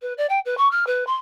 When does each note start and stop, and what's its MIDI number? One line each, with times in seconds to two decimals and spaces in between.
0.02 0.13 71
0.18 0.26 74
0.29 0.39 79
0.45 0.57 71
0.57 0.70 85
0.71 0.86 89
0.87 1.06 71
1.07 1.15 84